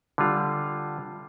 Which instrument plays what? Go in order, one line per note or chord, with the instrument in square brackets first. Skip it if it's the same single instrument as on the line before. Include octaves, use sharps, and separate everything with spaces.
[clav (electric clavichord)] D3 G3 F4